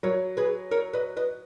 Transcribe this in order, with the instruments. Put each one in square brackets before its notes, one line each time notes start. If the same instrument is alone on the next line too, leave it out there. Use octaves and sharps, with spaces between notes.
[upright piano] F#3 [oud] A#4 C#5
[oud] G#4 B4
A#4 C#5
B4 D#5
B4 D#5